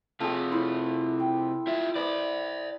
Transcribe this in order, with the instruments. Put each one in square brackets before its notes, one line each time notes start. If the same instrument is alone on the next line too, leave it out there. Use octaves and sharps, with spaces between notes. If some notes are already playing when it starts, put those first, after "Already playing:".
[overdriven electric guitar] C3 F4 [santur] G#4 A4
[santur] E4 C5
G5
[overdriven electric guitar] F4 E5
[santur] B4 D#5 D#6 [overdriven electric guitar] C5 D5